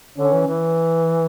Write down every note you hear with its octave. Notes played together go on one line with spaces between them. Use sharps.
D3 C#4
E3
E3